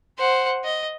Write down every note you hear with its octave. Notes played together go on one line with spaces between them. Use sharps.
C5 F#5
D#5